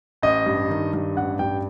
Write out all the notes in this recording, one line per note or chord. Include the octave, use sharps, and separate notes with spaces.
A1 D#5
G2
D#3
G2
A1 F#5
G2 G5